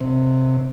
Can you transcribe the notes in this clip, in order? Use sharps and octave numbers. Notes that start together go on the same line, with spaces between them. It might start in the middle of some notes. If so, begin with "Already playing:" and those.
C3